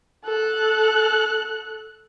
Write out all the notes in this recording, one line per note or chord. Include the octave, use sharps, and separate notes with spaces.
A4 F#6